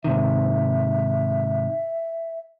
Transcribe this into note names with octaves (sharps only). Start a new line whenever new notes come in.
G#2 C3 D#3 E5